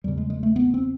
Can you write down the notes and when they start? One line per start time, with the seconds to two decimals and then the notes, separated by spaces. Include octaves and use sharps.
0.04 E2 C#3 G3
0.17 G#3
0.30 G#3
0.43 A3
0.56 B3
0.74 C4